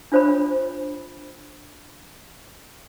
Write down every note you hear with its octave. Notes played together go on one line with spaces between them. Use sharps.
D4 F4 C5 C#5 B5